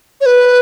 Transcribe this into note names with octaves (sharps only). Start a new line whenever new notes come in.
C#5
B4